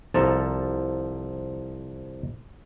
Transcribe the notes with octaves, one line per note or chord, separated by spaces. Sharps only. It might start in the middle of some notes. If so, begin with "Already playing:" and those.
C2 F3 A4 A5 A#5